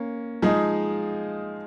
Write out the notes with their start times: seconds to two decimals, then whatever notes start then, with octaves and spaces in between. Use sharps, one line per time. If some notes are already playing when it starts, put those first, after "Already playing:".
Already playing: A#3 C#4
0.42 F3 G#3 D#4 G#4